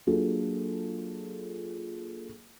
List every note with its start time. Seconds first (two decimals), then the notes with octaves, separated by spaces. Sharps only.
0.07 F#3 A#3 D4 F4 G#4 A4